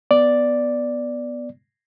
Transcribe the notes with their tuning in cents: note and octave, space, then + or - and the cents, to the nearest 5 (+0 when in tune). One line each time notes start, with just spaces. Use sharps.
B3 +0 D5 +0